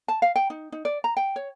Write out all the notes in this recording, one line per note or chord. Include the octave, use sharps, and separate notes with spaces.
A5
F5
G5
D#4
D#4
D5
A#5
G5
C#5